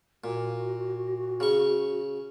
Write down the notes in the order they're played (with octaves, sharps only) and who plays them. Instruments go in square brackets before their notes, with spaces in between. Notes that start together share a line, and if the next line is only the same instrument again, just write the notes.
[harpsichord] A#2 [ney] F#4
[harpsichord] C#3 C#6